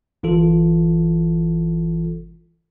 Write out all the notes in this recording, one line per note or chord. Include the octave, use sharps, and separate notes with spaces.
G1 E3 F4 A4